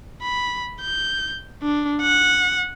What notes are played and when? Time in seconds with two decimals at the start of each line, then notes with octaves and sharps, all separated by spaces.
0.23 B5
0.81 G6
1.62 D4
2.02 F#5